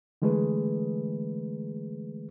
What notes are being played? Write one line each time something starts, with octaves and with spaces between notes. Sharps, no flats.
D3 E3 G#3 A3 G#4 B4